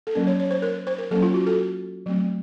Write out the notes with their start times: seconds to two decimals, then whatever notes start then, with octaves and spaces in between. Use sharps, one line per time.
0.07 A4
0.15 F#3 A#3 C#4 A#4
0.27 C#5
0.39 C#5
0.51 C5
0.62 A#4
0.87 C5
0.99 A#4
1.11 F#3 A#3 C#4 A4
1.23 F4
1.34 F#4
1.47 A4
2.06 F#3 A3 C4